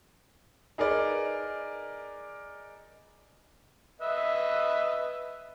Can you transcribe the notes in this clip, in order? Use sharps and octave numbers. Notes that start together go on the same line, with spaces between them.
D#4 G#4 A#4 B4 D5
B4 D#5 E5